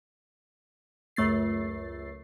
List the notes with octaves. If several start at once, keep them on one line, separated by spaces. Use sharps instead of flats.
C#2 F#2 A3 A6 C7